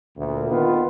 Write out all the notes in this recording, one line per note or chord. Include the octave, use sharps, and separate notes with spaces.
D2 A#2
D#3 B3 F4